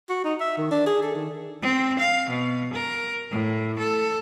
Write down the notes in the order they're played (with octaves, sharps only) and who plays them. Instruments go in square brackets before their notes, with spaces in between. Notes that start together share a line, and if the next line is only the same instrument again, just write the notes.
[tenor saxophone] F#4
D#4
E5
D#3
D4
G#4
A4
D#3
[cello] C4
F5
B2
A#4
A2
A4